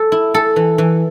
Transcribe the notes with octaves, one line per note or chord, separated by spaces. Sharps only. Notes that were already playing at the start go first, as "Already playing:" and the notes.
Already playing: A4
E4
A4
E3
E3